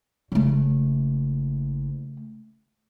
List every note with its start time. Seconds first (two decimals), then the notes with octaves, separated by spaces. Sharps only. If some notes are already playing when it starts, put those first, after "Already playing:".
0.32 F#1 C#3 A3